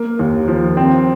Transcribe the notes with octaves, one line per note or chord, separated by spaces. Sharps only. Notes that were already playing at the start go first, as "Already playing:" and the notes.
Already playing: A#3
D#2
F3
C4